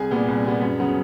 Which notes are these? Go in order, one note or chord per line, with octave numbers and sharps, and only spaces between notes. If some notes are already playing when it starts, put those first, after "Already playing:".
Already playing: C2 G#4 G#5
A#2 G3 B3
C2
A#2 G3 B3
F#2
C#3 F#3 B3